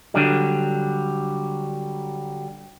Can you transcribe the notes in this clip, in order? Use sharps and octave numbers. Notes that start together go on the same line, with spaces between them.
D3 F#3 G3